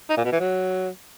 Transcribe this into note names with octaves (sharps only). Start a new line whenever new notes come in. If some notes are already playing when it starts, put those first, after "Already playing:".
D#4
A#2
B2
E3
F#3